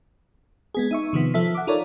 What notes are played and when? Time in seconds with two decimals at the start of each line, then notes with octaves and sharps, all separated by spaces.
0.74 G#3 B3 G#4
0.91 D#4 E5 C#6
1.13 C3 D#3 F3 B3
1.34 F3 A4 E5 B6
1.55 F#5 D6
1.67 D#4 F4 A4 A#4 C#5 D5